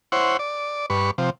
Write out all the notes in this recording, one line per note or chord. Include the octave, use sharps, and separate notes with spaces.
E4 C5 C#5 F#5
D5
G2 B4 C#6
C3 F3